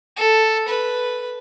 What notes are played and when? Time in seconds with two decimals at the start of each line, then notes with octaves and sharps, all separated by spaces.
0.16 A4
0.68 B4